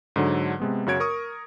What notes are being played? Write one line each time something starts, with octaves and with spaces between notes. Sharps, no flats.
G#2 D3 F#3
C3 G#3 B3
F#2 C#3 F#4 C#5 G#6 D7
A#4 C#6 D#6